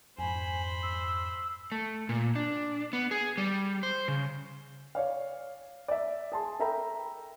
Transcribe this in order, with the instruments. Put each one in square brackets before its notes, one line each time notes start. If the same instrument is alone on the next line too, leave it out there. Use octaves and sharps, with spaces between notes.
[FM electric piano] F2 G#2 [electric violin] C5 B5 [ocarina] G#5
[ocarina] E6
[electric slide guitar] A3
A#2
D4
B3
G#4
G3
C5
C#3
[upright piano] C#5 D5 F5
D5 E5
G#4 A5 C6
A4 A#4 E5 G5 A#5 B5